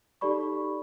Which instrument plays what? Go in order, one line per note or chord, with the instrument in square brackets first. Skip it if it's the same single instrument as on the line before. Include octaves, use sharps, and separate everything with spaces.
[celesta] D#4 G4 A4 D5 B5 C#6